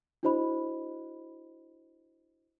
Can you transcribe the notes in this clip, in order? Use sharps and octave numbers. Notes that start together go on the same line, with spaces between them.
D4 E4 F#4 C5 D#5 B5